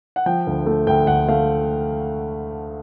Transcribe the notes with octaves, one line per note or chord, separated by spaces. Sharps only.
F#5
F3 G5
D2
A3
D2 G5
D2 F#5
A3 F5